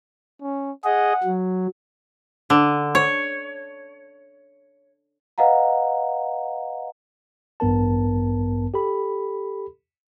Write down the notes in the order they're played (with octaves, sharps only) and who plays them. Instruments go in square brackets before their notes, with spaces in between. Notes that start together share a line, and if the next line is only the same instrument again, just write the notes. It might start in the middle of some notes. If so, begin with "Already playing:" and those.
[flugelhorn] C#4
[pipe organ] G#4 D#5 [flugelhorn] F#5
[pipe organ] F#3
[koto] D3
C#5
[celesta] B4 D#5 F5 F#5 A#5
[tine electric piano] A1 G2 B3 A#4 A5
G4 A4 B5